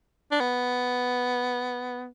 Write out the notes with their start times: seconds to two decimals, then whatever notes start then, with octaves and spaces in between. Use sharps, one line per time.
0.31 D4
0.40 B3